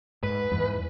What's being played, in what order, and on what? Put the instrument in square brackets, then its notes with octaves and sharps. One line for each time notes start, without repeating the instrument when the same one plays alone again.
[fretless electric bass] G#2 [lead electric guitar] B4
[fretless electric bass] E2 G#2 E3